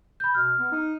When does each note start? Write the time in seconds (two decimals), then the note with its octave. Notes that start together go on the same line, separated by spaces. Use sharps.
0.20 B5 G6
0.34 B2 F6
0.59 B3
0.72 D#4